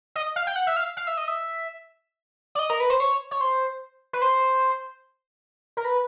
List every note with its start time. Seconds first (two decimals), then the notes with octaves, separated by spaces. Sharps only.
0.16 D#5
0.36 F5
0.47 G5
0.56 F#5
0.67 E5
0.77 F5
0.97 F5
1.07 E5
1.17 D#5
1.28 E5
2.55 D5
2.59 D#5
2.70 A#4
2.80 B4
2.90 C5
3.00 C#5
3.31 C#5
3.41 C5
4.13 B4
4.22 C5
5.77 A#4
5.85 B4